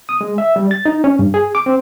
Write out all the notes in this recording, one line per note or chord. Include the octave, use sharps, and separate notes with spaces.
D#6
G#3
E5
G3
A6
D#4
C#4
G2
G#4
D6
C4